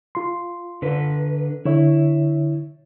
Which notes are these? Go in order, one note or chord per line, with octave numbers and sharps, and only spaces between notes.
F4 C6
D3 B4
D3 E4 C#5 E5